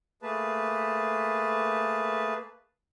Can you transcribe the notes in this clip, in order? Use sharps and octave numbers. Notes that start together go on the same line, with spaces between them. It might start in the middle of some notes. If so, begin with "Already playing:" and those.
A3 A#3 G#4 B4 A5